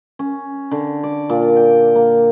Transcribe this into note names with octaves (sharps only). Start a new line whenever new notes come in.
C#4
D3
D5
A#2
G5
A#3